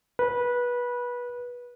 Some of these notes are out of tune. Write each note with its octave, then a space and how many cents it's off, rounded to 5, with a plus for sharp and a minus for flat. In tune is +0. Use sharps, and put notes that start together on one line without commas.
B4 -20